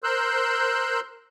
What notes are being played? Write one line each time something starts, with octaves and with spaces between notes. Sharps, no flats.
A#4 C5 C6 E6 F#6 G6